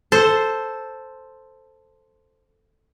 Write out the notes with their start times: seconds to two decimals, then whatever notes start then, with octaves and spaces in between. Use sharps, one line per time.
0.12 A4 C5